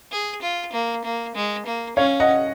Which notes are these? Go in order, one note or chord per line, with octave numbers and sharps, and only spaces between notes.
G#4
F4
A#3
A#3
G#3
A#3
C#4 C#5 F5
D#5 F#5